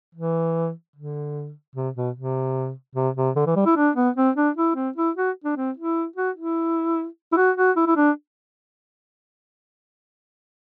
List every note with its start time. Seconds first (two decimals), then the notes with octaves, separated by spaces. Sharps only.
0.15 E3
0.96 D3
1.76 C3
1.96 B2
2.16 C3
2.95 C3
3.17 C3
3.36 D3
3.47 E3
3.56 G3
3.66 E4
3.76 D4
3.96 B3
4.16 C4
4.36 D4
4.57 E4
4.76 C4
4.96 E4
5.17 F#4
5.44 D4
5.57 C4
5.77 E4
6.16 F#4
6.36 E4
7.32 E4
7.37 F#4
7.57 F#4
7.77 E4
7.87 E4
7.97 D4